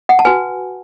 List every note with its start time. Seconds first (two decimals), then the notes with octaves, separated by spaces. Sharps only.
0.09 F#5
0.19 A5
0.25 F#4 B4 G#5